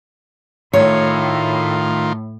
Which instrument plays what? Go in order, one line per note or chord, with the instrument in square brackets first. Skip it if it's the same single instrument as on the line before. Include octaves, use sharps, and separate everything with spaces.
[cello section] A2 [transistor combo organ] D#3 F4 [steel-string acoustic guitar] C#5